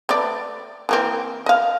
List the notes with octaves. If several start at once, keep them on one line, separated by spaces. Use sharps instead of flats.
A3 B4 D5
E3 A#3 C4
D#5 F5